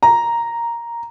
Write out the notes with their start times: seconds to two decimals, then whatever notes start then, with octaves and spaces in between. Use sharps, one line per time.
0.03 A#5